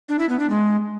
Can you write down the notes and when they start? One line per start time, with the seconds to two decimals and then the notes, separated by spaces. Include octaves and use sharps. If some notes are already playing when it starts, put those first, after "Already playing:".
0.09 D4
0.19 E4
0.29 B3
0.39 D4
0.50 G#3